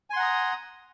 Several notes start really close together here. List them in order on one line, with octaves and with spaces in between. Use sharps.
G#5 C6 F#5 A#5 D#6